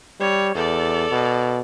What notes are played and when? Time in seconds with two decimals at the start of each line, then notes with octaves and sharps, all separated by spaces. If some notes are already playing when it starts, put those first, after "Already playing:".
0.20 G3 C#5
0.55 E2 A4 D5
1.12 B2